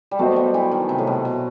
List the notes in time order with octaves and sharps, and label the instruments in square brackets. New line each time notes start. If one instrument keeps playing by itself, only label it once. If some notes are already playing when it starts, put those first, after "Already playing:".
[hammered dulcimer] G3
[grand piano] F#3 B3 F#4 C5 D#5 [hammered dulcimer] A3
[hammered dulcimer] G3
E3
D#3
C3
A2
B2
B2